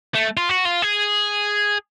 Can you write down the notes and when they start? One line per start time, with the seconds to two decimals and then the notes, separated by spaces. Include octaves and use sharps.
0.15 A3
0.37 F4
0.49 F#4
0.65 F4
0.82 G#4